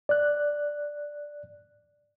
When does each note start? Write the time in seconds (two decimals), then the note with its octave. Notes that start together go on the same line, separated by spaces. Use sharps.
0.09 D5 F#6